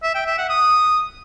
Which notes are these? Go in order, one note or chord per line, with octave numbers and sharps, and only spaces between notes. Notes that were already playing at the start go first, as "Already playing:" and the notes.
E5
G5
E5
F#5
D#6